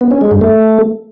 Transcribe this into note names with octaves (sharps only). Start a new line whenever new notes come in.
B3
C#4
G#3
G2
A3